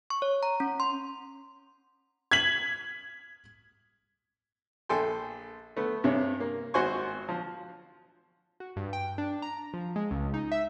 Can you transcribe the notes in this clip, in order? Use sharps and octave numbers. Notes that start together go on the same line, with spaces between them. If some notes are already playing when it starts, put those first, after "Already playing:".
C#6
C#5
A#5
C#4
C6
G#6 B6 F#7
A#1 A4 G5 G#5 C6
A3 B3
G2 C3 G#4 C#5
A#3
G#1 F#4 C5 G#5 C#6
F3
F#4
G2
G5
D4
A#5
F3
G#3
C#2
D#4
E5